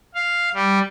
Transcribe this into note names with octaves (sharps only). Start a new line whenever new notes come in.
F5
G3